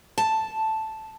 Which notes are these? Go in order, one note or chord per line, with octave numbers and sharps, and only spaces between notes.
A5